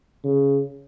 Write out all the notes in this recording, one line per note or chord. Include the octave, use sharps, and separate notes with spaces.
C#3